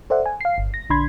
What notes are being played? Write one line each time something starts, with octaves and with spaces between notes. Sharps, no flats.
A4 C5 D5 E5 F#5
G#5
F5 C7
G1
A#6
A#1 D3 D4 B5 C6 G#6